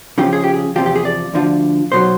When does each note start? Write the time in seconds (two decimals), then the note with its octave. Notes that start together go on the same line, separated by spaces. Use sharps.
0.18 C#2 C#3 F3 G4
0.33 G#4
0.44 G4
0.54 G#4
0.76 E2 C3 F3 G4
0.86 G4
0.96 G#4
1.05 D5
1.34 D2 D3 F3
1.92 B1 B2 F#3 C5